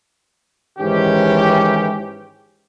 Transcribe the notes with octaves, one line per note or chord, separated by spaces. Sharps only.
G#2 D#3 E3 C#4 G4